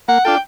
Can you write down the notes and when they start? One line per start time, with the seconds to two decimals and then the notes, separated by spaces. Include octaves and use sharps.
0.08 A#3 F#5
0.25 D4 F4 A4 G5